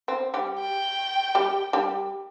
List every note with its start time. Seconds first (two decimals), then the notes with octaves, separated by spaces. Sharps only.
0.08 C4
0.34 G3 G4
0.60 G5
1.35 G3 G4
1.73 G3 G4